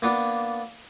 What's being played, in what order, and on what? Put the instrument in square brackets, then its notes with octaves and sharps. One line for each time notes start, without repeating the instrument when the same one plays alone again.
[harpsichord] A#3 B3 D4